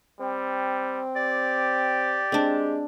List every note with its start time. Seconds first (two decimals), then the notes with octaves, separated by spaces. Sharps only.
0.20 G3 C4
1.16 G4 D5
2.32 G#3 C4 D4